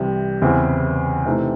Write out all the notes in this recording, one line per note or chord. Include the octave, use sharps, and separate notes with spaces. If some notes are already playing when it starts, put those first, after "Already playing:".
Already playing: C2 C3 E3
E2 C#3 E3 C4
C3 E3 A3 C4 D#4